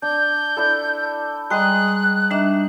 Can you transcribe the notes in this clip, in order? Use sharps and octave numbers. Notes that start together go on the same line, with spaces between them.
D4 G6
D4 E4 A4
G3 G#3 G5 A#5 D#6 F#6
G3 D4 D#4 E5